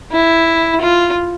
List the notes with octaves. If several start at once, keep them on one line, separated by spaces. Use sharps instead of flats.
E4
F4